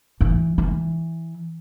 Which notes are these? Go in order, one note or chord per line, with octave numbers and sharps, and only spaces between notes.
E3
E3